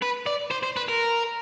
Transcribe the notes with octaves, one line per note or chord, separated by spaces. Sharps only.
B4
D5
C5
C5
B4
A#4